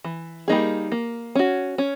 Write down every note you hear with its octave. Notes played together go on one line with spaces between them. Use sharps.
E3
G3 A#3 D#4 G#4
A#3
C#4 F#4
C#4